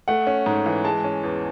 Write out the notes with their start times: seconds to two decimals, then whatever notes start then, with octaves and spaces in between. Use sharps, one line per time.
0.08 A3 F#5
0.27 C#4
0.46 G#2
0.66 E3
0.84 G#3 A5
1.04 C#4
1.23 E2